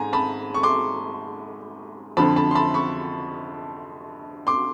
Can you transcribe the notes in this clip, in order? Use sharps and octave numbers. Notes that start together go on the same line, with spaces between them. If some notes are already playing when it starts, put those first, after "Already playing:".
Already playing: G#2 G#5 A#5
A5 B5
C#6
C6 D6
F2 D3 F3 A5 B5
A5 B5
C6
A5 B5
B5 C#6
C6 D6